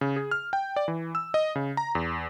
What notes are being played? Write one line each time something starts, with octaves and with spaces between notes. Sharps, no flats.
C#3
G#4
F6
G5
D5
E3
E6
D#5
C#3
A#5
E2